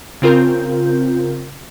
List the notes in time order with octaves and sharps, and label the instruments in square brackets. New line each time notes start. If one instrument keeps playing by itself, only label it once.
[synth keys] C#3 C4 F4 A#4 G6